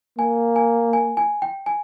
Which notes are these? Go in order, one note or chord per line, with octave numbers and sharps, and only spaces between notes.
A#3 G#5
G#5
G#5
G#5
G5
G#5